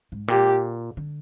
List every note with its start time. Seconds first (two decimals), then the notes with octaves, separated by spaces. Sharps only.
0.12 G#2
0.28 A#2 G4
0.97 D3